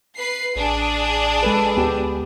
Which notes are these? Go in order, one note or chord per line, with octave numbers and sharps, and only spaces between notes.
B4 C7
A1 D4 G#4
G#3 A4 B4
D2 B3 G4